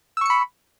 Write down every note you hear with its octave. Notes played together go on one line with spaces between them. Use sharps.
B5 C#6 E6 C#7